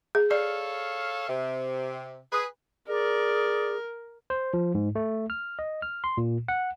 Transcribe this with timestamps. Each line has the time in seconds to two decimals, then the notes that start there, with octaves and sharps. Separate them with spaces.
0.15 G#4
0.31 A4 C#5 D5 F5
1.29 C3
2.32 G#4 B4
2.88 G#4 A#4 D5
4.30 C5
4.54 F3
4.75 G#2
4.95 A3
5.30 F6
5.59 D#5
5.82 F6
6.04 C6
6.17 A#2
6.48 F#5